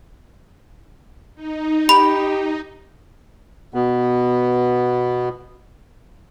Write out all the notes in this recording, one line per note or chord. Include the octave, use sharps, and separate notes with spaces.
D#4
G4 B5
B2 B3